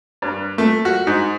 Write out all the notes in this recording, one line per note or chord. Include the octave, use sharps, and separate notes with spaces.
G2
A3
F#4
G#2